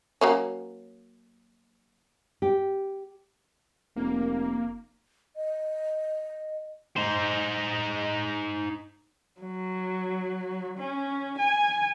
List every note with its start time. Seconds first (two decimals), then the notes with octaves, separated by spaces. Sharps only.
0.21 F#3 A#3 C#4
2.42 G4
3.96 F1 A#3
5.36 D#5
6.97 D#4 C5
9.41 F#3
10.78 C#4
11.38 G#5